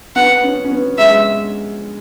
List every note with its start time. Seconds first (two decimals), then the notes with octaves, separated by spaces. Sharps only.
0.16 B3 F#5
0.43 C#4
0.65 C#4
0.72 B3
0.98 G#3 E5